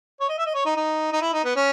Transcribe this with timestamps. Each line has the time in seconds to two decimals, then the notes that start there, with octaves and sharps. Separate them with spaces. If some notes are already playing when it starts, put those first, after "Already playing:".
0.21 C#5
0.29 D#5
0.38 E5
0.46 D#5
0.54 C#5
0.65 D#4
0.76 D#4
1.13 D#4
1.22 E4
1.33 D#4
1.44 B3
1.56 C#4